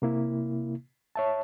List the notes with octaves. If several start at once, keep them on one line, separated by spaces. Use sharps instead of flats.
C3 A#3 E4
C#5 E5 A5